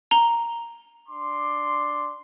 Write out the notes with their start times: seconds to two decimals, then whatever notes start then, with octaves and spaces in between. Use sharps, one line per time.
0.11 A#5 G7
1.08 D4 C6 D6